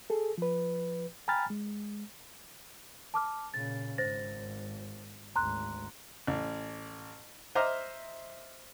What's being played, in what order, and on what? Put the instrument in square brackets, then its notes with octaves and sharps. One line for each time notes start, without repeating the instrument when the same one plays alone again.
[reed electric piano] G#4 A4
F3 B4
G5 G#5 A#5 B5 F6 A6
G#3
[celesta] A5 D6 F6
[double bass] A#2 C#3 [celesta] A6
[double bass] G#1 [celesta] C5 A6 A#6
[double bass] G#1 D2 [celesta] A#5 C6 F#6
[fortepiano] A1
C5 D#5 E5 A#5 D6 F6